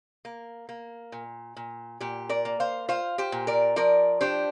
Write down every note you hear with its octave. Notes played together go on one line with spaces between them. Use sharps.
A#3
A#3
A#2
A#2
A#2 G4
A#4 D5
A#3
C5 F5
F4 C5 F5
G4 C5
A#2
A#4 D5
F3 A#4 D5
D4 G4 C5